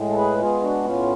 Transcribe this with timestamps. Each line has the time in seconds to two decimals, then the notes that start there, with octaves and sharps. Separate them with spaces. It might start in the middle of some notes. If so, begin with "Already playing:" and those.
Already playing: A2 G#3
0.09 A4
0.16 G#4 B4
0.38 B3 F4 G#4
0.61 D4 F#4
0.84 A2 C#4 F4